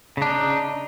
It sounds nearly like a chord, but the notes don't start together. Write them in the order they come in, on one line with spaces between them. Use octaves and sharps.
C#3 D4 D#4